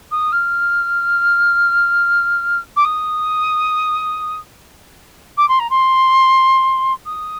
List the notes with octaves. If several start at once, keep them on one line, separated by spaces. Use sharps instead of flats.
D#6
F6
D6
D#6
D6
C6
A#5
C6
D#6